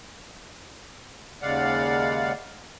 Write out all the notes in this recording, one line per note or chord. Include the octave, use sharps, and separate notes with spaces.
D#2 C#3 G#3 D5 F5 F#5